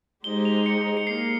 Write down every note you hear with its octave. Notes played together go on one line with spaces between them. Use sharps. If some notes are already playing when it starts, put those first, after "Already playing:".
G#3 D#4 G4 C5 G7
F7
C#7
C#7
A#3 D#4 A#4 C7